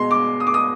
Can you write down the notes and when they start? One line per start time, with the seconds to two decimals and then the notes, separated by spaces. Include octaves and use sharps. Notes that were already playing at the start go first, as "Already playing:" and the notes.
Already playing: B2 G#3 C6
0.11 D6
0.40 D#6
0.47 D6
0.54 D#6